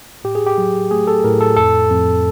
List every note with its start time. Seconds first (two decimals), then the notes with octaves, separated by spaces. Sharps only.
0.24 A2 G4
0.35 G#4
0.47 G4
0.58 F#3
0.91 A3 G#4
1.07 A4
1.24 A2 A#4
1.41 A4
1.56 F2 A4
1.90 F2